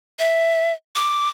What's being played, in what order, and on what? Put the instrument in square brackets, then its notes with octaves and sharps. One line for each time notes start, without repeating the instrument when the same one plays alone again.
[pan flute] E5
D6